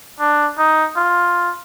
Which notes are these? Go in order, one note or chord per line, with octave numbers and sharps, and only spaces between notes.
D4
D#4
F4